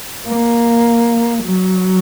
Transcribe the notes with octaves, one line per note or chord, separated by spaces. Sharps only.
A#3
F#3